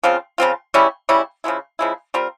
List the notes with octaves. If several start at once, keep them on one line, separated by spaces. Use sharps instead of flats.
C#3 F3 C4 F4
C#3 F3 C4 F4
C#3 G3 C#4 E4
C#3 G3 C#4 E4
C#3 F3 G#3 E4
C#3 F3 G#3 E4
G3 C4 F4 A#4